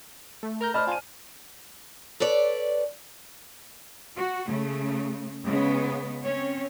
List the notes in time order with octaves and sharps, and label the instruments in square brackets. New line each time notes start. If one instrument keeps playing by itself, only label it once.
[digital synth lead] A3
[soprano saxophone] A#4 [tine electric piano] A#5 F6 G6
[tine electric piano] C5 D5 A5 [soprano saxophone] D#5 [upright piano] B5 F6
[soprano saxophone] F4 [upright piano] G#5 D#7
[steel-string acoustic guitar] A4 B4 C#5 D5
[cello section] F#4
C#3 A3
C#3 G#3 B3
C4 C#4 C#5